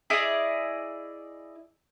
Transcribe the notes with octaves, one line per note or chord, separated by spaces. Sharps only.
E4 G#4 D5 D#5